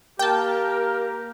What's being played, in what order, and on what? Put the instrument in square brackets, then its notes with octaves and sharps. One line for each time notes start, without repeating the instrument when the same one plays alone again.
[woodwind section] A#3 G4 A#4 [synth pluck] G5 A5